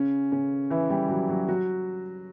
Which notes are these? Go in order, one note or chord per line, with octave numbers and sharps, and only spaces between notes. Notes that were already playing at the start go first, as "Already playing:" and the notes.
Already playing: C#3 C#4
C#3 C#4
E3 E4
G3 G4
F#3 F#4
F#3 F#4
F#3 F#4